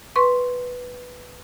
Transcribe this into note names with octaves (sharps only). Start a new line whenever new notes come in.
B4 C6 C#6